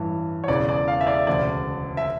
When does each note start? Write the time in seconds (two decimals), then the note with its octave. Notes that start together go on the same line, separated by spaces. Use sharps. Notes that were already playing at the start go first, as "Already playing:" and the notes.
Already playing: A1 G2 E3
0.44 C#5
0.48 E1 E2 C#3 D5
0.69 D5
0.88 F5
1.01 E5
1.07 D5
1.27 E1 D2 C#3 D5
1.97 E5